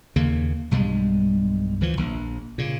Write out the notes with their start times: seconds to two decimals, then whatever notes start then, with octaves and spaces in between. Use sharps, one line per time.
0.16 D#2 C#3 A#3
0.71 B1 G2 G3 G#3
1.81 D2 E3 F3
1.97 A#1
2.58 A#2 C#3